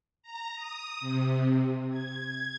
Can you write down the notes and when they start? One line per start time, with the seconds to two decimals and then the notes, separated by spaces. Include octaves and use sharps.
0.23 A#5
0.56 D#6
1.01 C3
1.90 G#6
2.24 G#6